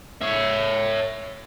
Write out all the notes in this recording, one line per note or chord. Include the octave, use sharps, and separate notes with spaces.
C#5 E5